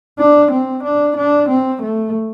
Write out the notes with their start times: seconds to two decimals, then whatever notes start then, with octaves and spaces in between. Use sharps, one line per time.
0.19 D4
0.51 C4
0.83 D4
1.17 D4
1.49 C4
1.82 A3